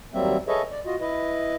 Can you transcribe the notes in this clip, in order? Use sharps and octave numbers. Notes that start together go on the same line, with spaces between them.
D#2 F#3 G3 A#3 C4 E5
G#4 A4 B4 C#5 D#5 E5
D5
F4 F#4 D#5
E4 B4 D#5